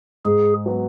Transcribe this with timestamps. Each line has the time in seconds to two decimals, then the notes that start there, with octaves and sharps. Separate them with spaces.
0.25 G#2 G#4
0.66 F#3 B3 F#4